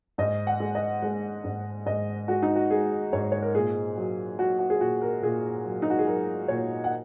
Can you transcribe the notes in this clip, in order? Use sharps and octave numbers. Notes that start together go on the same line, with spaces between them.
G#2 D#5
F#5
G#3
D#5
G#3
G#2
G#2 D#5
G#3 F#4
D#4
F#4
G#3 G#4
G#2 C#5
C#5
A#4
A#2 G#4
F#3
F#3 F#4
F#4
G#4
A#2 F#4
A#4
A#2 G#4
F#3
D#4
F#4
G#4
F#3 A#4
A#2 C#5
F#5